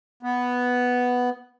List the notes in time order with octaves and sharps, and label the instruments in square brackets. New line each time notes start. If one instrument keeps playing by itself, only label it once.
[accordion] B3